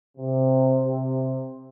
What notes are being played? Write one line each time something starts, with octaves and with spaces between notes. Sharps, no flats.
C3
C3